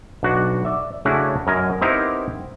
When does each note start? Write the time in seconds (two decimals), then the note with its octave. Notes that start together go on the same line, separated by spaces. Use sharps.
0.23 B1 D4 F#4
0.65 D5 E5
1.05 C#3 A3 C#4 D4 E4 F#4
1.47 F#2 A#4 D#5 G#5
1.81 B3 C4 D#4 E4 G4 A#4